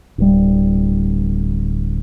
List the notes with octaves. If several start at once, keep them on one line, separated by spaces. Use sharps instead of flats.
D1 G3